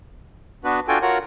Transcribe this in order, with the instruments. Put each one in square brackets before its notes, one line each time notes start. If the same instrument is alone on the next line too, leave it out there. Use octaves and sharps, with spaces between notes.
[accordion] B3 D4 F#4 B4
D4 F4 F#4 A4 G5 G#5
F4 F#4 A#4 C#5 F#5